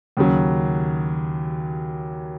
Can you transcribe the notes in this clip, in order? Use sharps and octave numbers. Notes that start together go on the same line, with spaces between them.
D#2 C#3 F#3